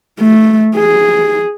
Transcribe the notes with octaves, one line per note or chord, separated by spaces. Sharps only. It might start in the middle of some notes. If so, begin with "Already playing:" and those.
A3
G#4